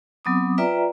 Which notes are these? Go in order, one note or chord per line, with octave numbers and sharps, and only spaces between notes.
F#3 B3 C4 D6 D#6
F4 B4 D5 E5 G5 A#5